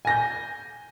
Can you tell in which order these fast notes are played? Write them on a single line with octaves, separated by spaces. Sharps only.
G#5 A#6 G6